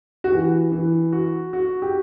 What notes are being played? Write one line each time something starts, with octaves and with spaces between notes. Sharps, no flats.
F#4
E3 G4
E3
F#4
F#4
G4